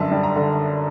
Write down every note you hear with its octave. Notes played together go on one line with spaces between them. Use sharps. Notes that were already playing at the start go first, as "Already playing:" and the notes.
Already playing: G1 F#2 D3 G3 E5 A5
G3
A#5
D3